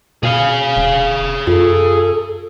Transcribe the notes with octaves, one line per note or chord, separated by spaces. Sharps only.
B2 G#4 F5
E1
F#2 F4 A4